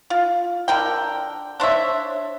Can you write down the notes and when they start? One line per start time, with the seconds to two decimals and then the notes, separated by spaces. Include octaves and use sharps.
0.10 F4
0.68 D3 A#4 G5
1.60 D4 C5 C#5 E5